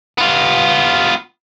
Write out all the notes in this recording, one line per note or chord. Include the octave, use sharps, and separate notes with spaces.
B3 F4